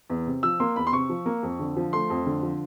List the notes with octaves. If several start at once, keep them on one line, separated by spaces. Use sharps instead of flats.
E2
C3
F3 E6
A#3 C6
E2 B5
C6
C3 C#6
F3
A#3
F2
D3
F3
A3 C6
F2
D3
F3